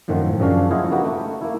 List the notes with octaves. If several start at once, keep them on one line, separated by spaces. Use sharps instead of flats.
F#2 A2 D#3 F3 C4 F#5
F#2 C#3 F3 C#4 D4 F5
E4 F4 G#4 C5 D#5 F#5
A#3 D#4 F#4 G4 B4
A3
A#3 E4